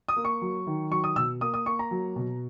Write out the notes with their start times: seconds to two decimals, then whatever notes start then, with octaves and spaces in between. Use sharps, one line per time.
0.08 D#6
0.16 A#3
0.25 C#6
0.42 F#3
0.67 D#3
0.91 F#3 C#6
1.04 D#6
1.16 B2 E6
1.41 A#3 D#6
1.54 D#6
1.66 A#3 C#6
1.79 A#5
1.91 F#3
2.16 B2